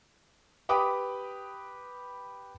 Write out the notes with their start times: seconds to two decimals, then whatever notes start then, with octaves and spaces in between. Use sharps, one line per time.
0.69 G4 B4 G5 B5 D6 D#6